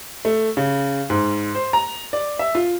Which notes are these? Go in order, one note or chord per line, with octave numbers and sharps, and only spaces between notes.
A3
C#3
G#2
C5
A#5
D5
E5
F4